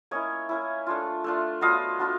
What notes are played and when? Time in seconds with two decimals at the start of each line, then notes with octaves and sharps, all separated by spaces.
0.11 A#3 C#4 E4 C#5 D#5
0.49 A#3 C#4 E4
0.87 A3 D4 F4
1.24 A3 D4 F4
1.61 F#3 B3 D4 F4 D#5 F5
1.99 F#3 B3 D4 F4